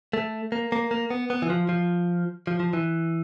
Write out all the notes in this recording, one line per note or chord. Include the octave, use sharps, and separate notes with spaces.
A3
A#3
A#3
A#3
B3
B3
E3
F3
F3
F3
F3
E3